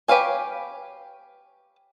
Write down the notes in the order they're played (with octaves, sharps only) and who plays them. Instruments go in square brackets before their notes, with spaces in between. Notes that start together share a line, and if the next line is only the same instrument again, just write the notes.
[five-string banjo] G4 B4 C#5 F5 G#5